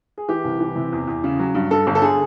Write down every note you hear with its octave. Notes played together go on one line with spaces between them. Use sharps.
G#4
E3 G4
C2
E3
C3
E2
E2
C#3
F#3
G2
G2 A4
G1
A4
D3 G#4